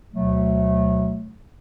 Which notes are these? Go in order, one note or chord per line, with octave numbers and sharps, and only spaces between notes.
D2 B2 F#3 A3